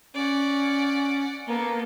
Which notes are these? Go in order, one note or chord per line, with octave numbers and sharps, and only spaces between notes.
C#4 D5 F#5
A#3 B3 A4